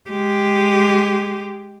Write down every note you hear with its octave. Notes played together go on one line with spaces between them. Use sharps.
G#3 G4